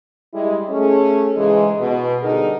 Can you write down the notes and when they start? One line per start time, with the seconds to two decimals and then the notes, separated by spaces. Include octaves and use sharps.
0.33 G3 G#3 E4
0.70 A3 C#4 G#4
1.35 G#2 C#3 E3 G#3
1.80 B2
2.22 D3 G3 B3 D#4 G#4 A#4